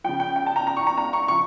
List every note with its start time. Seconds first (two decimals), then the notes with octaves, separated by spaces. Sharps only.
0.04 C#3 F3 G5
0.20 G5
0.36 G5
0.46 A5
0.56 A#5
0.67 A#5
0.77 C#6
0.87 A#5
0.98 A#5
1.13 C#6
1.28 C#3 F3 C#6